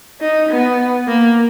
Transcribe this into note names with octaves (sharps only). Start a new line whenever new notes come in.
D#4
B3
A#3